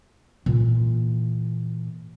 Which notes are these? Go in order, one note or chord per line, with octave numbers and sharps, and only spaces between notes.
A#2 E3